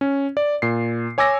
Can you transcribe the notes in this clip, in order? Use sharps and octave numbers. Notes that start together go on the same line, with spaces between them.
C#4
D5
A#2 C7
C#5 G#5 D6 E6 A#6